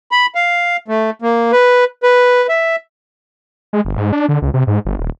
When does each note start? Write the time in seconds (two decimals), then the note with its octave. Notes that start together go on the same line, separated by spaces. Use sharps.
0.11 B5
0.35 F5
0.88 A3
1.22 A#3
1.52 B4
2.03 B4
2.49 E5
3.73 G#3
3.85 G1
3.98 G#2
4.13 D4
4.29 D3
4.42 C#2
4.54 C3
4.67 G#2
4.85 G1
4.99 D#1